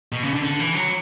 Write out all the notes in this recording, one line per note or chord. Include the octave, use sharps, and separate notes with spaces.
B2
C#3
D3
D3
E3
F#3